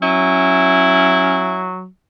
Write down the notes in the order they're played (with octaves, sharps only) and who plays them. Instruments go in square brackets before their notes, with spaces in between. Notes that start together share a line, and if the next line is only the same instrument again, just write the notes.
[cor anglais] F#3 [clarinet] C#4 [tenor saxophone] E4